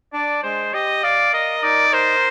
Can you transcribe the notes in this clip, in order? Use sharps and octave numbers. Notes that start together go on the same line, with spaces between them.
D4 D5
G#3 C5
G4 D#5
D5 F5
A#4 D#5
D#4 D5
A#4 C5